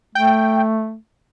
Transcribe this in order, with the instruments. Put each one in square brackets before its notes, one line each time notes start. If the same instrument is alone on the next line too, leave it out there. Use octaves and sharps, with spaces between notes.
[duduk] A3 [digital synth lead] G5